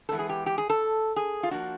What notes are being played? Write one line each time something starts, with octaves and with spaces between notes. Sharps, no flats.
E3 G#3 B3 D4 A4
G#4
G4
G4
G#4
A4
G#4
F4
F3 A#3 D4 F#4